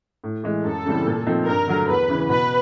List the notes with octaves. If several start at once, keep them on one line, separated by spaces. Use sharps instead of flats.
A2
E3 G#3
F#2 A4
C#3 E3 G3 C4
A#2
F3 A3 C4 D#4
G2 A#4
D3 F#3 A3
E2 B4
C#3 E3
B2 B4